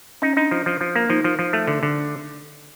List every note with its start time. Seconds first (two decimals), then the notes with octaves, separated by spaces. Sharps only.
0.22 C#4 D#4
0.37 D4 D#4
0.51 F3
0.66 F3
0.81 F3
0.96 A#3
1.09 F3 D#4
1.24 F3
1.39 F3
1.53 A3
1.67 D3
1.83 D3